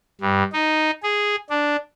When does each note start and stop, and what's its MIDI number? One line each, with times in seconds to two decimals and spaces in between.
0.21 0.43 43
0.53 0.91 63
1.03 1.36 68
1.50 1.77 62